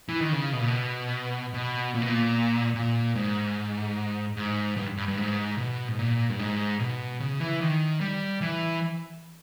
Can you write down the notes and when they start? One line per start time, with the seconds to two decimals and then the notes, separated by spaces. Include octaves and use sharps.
0.09 E3
0.21 D#3
0.32 C#3
0.53 B2
0.60 A#2
0.68 B2
1.54 B2
1.94 A#2
2.02 B2
2.09 A#2
2.75 A#2
3.15 G#2
4.37 G#2
4.77 G2
4.97 G2
5.08 G2
5.18 G#2
5.58 B2
5.88 G#2
5.99 A#2
6.30 G2
6.39 G#2
6.79 B2
7.20 C#3
7.40 E3
7.61 D#3
8.01 G3
8.41 E3